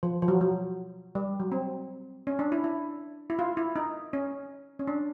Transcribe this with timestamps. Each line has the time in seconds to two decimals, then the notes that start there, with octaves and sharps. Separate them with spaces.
0.03 F3
0.22 F3
0.28 F#3
0.41 F#3
1.15 G3
1.40 F#3
1.52 C4
2.27 C#4
2.39 D4
2.52 E4
2.64 E4
3.30 E4
3.39 F4
3.57 E4
3.76 D#4
4.13 C#4
4.79 C#4
4.88 D4